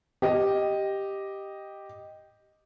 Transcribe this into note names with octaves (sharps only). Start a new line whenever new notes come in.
G4 D#5